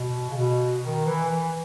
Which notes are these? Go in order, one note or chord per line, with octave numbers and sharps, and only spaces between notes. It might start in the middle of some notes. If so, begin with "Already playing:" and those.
Already playing: B2
C#3
B2
D#3
E3
E3